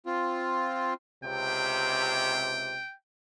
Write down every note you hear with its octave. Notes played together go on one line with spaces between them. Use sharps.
C4 F4
C#2 C3 G5